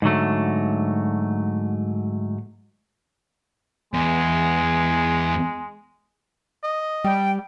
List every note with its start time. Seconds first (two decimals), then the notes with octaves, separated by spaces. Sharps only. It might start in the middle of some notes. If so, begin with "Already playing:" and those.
0.02 G#2 D3 F#3 A3
3.94 E2 G#3
6.64 D#5
7.04 G3 G5